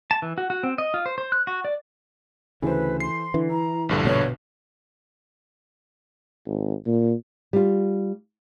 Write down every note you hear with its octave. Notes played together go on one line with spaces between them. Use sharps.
A5
E3
F#4
F#4
C4
D#5
F4
C5
C5
F#6
F#4
D5
D2 C#3 E3 A4 B4 C5
C6 C7
D3 E3
E4 A#5
A#1 G2 D3
B2 G#3 B3 C#5
G#1
A#2
G3 F4